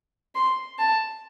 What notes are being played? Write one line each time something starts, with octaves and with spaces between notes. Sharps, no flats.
C6
A5